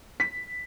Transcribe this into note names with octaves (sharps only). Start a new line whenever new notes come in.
B6